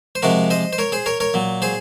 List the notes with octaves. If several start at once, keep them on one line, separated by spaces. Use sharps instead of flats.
C5
C3 F3 G#3 F#4 A#4
C5 D#5
C5
A#4 C#5
G#4 C5
A#4 C#5
A#4 C#5
A#2 F#3
G#4 C5